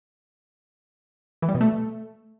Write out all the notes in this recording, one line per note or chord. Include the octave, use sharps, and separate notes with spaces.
E3
G3
B2
A3